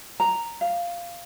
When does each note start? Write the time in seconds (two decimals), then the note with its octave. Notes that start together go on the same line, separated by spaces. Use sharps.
0.20 A#5
0.61 F5